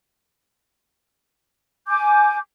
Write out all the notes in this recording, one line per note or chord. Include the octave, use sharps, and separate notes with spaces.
G#5 D6 G6